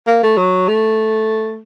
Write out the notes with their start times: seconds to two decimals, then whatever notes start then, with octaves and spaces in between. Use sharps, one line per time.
0.07 A#3
0.23 A3
0.37 F#3
0.68 A3